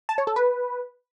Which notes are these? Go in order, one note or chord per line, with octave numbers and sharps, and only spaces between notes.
A5
C#5
A4
B4